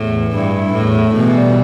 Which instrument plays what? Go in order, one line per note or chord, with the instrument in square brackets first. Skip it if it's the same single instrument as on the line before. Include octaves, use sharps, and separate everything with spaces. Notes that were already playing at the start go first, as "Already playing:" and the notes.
Already playing: [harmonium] E2 [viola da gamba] A2
[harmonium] E3
[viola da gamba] G2 [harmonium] E4
[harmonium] E4
[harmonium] E2 [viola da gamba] A2
[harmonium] A3
[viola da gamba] B2 [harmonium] E3
[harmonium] G3